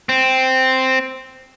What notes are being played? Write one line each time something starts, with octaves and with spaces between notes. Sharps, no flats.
C4